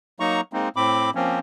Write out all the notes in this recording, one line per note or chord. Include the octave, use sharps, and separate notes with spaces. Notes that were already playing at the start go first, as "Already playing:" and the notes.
F#3 A#3 D#4 A#5 C#6
G#3 A#3 C4 D#4
A2 C4 B5 D6
F3 A#3 C4 C#4